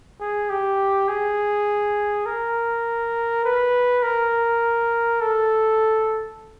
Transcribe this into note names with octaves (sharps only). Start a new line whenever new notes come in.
G#4
G4
G#4
A#4
B4
A#4
A4